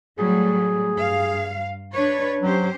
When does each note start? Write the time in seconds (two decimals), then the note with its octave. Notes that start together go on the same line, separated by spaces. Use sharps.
0.18 A2 F#3 G3 G#4
0.95 G2 F5
1.93 D4 B4 C#5
2.42 F#3 C#4 G4 C5